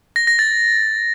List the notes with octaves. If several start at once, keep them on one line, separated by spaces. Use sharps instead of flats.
A#6
A#6
A6